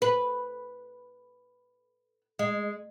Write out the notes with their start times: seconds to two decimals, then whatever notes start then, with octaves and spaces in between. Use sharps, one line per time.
0.02 B4
2.39 G#3